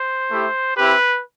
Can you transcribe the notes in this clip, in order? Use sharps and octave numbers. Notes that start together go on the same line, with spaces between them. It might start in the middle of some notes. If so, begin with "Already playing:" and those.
Already playing: C5
A3 E4 G4
C4 E4 G4 B4